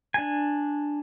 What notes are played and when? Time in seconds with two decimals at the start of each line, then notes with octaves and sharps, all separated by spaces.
0.14 D4 G#5